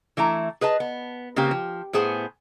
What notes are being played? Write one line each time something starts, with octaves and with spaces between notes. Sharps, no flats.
E3 A3 E4 A#5
G#4 B4 D#5 A5
B3
C#3 A#3 C4 G4
F3
A2 B3 G#4 C5 G#5